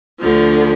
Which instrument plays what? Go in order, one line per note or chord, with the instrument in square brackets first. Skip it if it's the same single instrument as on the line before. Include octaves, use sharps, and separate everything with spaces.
[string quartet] D2 D3 F3